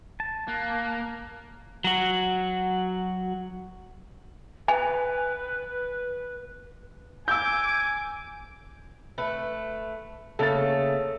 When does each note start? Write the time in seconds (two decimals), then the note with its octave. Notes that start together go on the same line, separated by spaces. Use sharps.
0.20 A5
0.48 A#3 F#6
1.84 F#3 F#4
4.68 B4 G#5
7.28 G#5 D6 E6 G6
9.18 A3 B4
10.39 C#3 A3 A#3 A4 A6